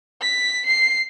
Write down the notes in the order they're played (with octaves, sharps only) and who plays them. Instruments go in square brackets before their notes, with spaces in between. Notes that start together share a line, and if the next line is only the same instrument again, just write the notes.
[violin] B6
C7